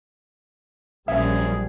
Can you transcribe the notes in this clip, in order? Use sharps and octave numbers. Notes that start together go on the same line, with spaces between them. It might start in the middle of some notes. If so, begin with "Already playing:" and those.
A#1 F#2 G3 G#4 E5